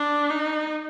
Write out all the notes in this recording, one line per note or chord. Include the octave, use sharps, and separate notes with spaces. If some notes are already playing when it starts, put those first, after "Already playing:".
Already playing: D4
D#4